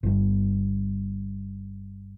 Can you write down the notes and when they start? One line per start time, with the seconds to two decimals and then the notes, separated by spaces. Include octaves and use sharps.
0.03 G1 G2